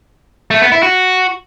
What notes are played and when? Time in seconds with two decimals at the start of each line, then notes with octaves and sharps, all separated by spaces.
0.51 A3
0.61 B3
0.72 E4
0.83 F#4